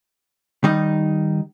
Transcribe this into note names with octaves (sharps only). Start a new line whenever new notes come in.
D#3 G3 D#4